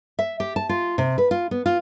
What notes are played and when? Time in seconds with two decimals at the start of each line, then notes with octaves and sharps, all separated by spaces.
0.19 E5
0.40 G4
0.56 A5
0.69 F4
0.98 C3
1.18 B4
1.31 F4
1.51 B3
1.66 F4